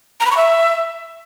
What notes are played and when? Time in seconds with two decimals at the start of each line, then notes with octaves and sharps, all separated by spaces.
0.20 A#5
0.26 B5
0.31 C#6
0.37 E5